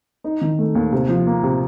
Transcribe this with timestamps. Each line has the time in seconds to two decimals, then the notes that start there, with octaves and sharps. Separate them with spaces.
0.24 D#4
0.41 D#3
0.59 A3
0.75 D#2
0.93 C3
1.09 F3
1.27 A#3
1.43 C3